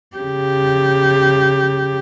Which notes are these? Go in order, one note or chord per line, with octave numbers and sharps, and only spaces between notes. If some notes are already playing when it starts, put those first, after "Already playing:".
C#3 G4